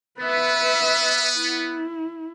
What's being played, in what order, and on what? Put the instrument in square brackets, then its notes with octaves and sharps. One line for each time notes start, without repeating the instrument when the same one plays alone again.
[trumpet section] B3 [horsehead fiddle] B4 E5
[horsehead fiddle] E4